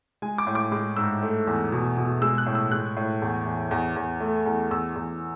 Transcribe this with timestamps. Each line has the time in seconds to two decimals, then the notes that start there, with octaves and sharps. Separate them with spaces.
0.22 G#3 G#5
0.38 D6
0.47 A2
0.55 D6
0.72 G#3 D6
0.96 G#2 E6
1.22 A3
1.47 E2
1.72 B2
1.97 B2
2.22 G#3 E6
2.38 F#6
2.46 A2
2.55 E6
2.71 G#3 F#6
2.97 A2
3.22 E2
3.46 E2
3.71 E2
3.96 E2
4.20 A3
4.46 E2
4.71 E2 E6
4.95 E2